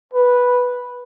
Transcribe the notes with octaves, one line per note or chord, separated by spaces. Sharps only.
B4